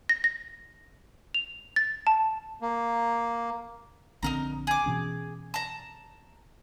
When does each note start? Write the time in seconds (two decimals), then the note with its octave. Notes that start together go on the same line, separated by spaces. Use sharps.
0.09 A#6
0.24 A#6
1.34 F7
1.76 A6
2.07 A5
2.62 A#3
4.23 A#1 D3 C4 D#4 A#4 A#5
4.67 G#4 D6
4.86 B2 E3 C#4
5.54 A5 A#5